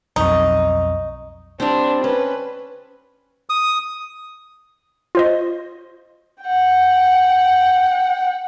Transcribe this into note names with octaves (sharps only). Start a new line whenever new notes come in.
B1 F2 D#4 C#6
G3 C4 D4
C#4 B4
D#6
F4 C5 D#5
F#5 G5